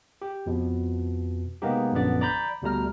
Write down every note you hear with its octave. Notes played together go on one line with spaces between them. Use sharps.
G4
F2 B2
C3 G#3 A#3 B3 D#4 G4
A#1 F#2 D3 B3 D5
D5 A#5 B5 G6
D2 B2 G3 A3 A#5 F6